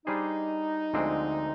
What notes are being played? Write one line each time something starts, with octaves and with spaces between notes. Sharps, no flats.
G3 D4 D#4 G#4 C5
D2 D3 F3 G#3 C4